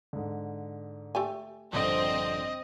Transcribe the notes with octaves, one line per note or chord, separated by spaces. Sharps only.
G#2 D3
A3 G4 G#5
A#1 G2 D3 C4 D#5